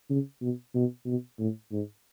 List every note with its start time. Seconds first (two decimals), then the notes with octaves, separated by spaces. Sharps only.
0.10 C#3
0.42 B2
0.75 B2
1.06 B2
1.39 A2
1.71 G#2